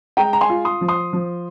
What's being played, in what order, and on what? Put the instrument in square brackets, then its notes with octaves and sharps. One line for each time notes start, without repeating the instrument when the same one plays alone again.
[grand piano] G#3 G5 A#5
A#5
G#5 C6
F4
C6 D#6
F3
C6 D#6
F3